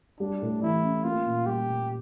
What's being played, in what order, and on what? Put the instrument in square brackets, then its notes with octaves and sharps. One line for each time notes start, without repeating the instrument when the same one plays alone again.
[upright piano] G3 [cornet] D4
[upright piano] A2
[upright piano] E3 [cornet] E4
[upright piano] C#4
[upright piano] A#3 [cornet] F4
[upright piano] A#2
[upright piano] G3 [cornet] G4
[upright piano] A#2